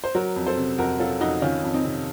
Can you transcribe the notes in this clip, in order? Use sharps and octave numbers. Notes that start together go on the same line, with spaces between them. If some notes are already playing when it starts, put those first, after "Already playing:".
C5
F#3 F#4 A#4
F2
A4 C5
C3
F2 F#4 A#4
F#3 F4 A4
F2 D#4 F#4
D#3 C#4 F4
F2
C4 D#4
C3